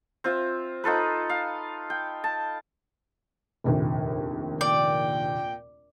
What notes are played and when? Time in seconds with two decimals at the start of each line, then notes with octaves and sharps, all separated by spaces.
0.24 C4 F4 E5
0.84 D#4 F4 A4 B4
1.30 F5
1.90 G5
2.24 A5
3.64 F1 A#1 D#2
4.61 A#2 D5 G5